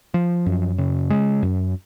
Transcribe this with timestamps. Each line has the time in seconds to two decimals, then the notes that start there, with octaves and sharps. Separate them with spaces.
0.14 F3
0.46 F#2
0.78 C#3
1.10 G#3
1.43 F#2